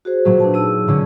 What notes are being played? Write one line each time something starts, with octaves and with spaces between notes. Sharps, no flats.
F#4 G#4 C5
A#2 F#3 A3
D4 B4 A5
D#4 G#4 E6 D#7
A#2 D3 C#4